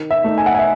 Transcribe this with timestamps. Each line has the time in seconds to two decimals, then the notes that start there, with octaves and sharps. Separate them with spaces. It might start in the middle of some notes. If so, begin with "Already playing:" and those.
Already playing: D#3
0.11 E5
0.24 A3 D#4
0.38 G#5
0.46 F#5
0.55 G#5
0.59 E5